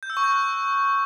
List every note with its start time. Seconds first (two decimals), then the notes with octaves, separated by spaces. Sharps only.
0.03 G6
0.10 E6
0.17 C#6
0.24 G6
0.31 F#6